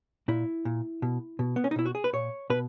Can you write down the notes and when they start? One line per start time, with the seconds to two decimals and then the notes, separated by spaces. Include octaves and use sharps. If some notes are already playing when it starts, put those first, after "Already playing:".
0.28 A#2 E4
0.65 A#2
1.02 B2
1.39 B2
1.56 B3
1.64 C#4
1.71 D#4
1.76 B2 E4
1.86 F#4
1.95 G#4
2.04 B4
2.13 A#2 C#5
2.50 B2 B4